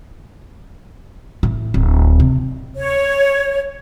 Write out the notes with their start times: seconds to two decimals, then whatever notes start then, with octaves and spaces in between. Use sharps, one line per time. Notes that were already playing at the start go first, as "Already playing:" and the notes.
1.43 A2
1.74 D1
2.20 C3
2.76 C#5